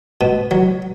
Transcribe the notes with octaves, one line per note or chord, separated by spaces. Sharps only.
B2
F#3